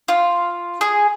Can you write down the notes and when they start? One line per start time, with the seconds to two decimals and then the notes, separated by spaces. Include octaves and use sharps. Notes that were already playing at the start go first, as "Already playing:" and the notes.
0.08 F4
0.81 G#4